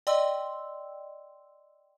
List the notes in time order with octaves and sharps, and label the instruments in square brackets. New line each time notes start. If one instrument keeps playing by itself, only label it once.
[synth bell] D5 D#5 G5 C6 E6